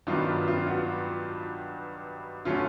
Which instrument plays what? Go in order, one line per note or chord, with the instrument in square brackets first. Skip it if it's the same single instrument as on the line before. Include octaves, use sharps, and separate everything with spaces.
[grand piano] G2 D#3 F#3 B3 D4 [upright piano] F4
[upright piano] F4
F#4
[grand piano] D3 F#3 A3 C#4 [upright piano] F4